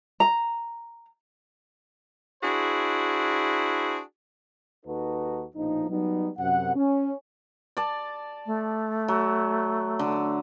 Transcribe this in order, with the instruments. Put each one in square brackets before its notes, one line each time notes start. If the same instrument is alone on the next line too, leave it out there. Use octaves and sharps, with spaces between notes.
[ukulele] A#5
[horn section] D4 E4 F#4 G#4 C5
[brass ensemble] D#2 D#4 F#4 A4 B4
A#1 B2 F3 D#4
F#3 G3 B3 D#4
F#2 C3 F#5
C#4
[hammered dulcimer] D5 A5
[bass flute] A3
[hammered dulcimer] F#3
D3